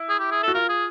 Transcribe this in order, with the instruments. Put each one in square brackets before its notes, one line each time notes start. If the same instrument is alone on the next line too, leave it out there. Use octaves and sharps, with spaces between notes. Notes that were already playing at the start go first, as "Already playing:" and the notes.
Already playing: [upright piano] E4
[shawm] G#4
G4
G#4
[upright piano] F#4 [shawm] A4
[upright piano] F4 [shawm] A#4
[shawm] G#4